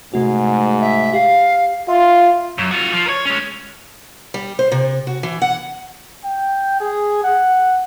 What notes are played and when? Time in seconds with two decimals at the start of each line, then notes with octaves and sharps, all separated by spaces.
0.14 G#2 C3 A3 F#4
0.80 E5
1.13 G4 F5
1.88 F4 E5 C6
2.58 F#2
2.71 F4 F#4
2.93 F3
3.06 A#4 C#5
3.25 G#3 C#4
4.34 G3
4.59 C5
4.72 C3
5.07 F#4
5.23 E3
5.42 F#5
6.25 G5
6.80 G#4
7.24 F#5